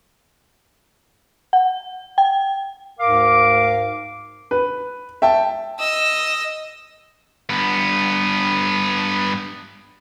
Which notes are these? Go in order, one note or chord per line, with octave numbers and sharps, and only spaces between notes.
F#5
G5
D2 G#2 A#4 F5 D6
B4
E5 G5 A5
D#5 E6
G2 B3